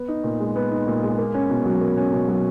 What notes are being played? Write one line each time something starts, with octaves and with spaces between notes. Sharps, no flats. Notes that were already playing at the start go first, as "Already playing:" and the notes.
Already playing: B3
D#4
A#2
G#3
B3
D#4
A#2
G#3
A#3
C#4
B2
F#3
A#3
C#4
B2
F#3